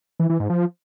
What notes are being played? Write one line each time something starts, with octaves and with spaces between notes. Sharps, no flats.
E3
E3
G#2
F3